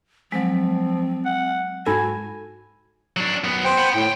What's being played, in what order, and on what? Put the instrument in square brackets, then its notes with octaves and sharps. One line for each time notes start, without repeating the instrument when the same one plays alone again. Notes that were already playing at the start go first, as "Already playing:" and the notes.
[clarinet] F3 [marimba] F#3 G#3 [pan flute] C4
[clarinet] F#5
[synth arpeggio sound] G#2 A4 [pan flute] F#4 [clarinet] G#5 [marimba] B5
[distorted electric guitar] F#3 D4
F#2 B3
[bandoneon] C5 G5
[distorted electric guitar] F#5 B5
[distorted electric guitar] D2 G5 [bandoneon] A2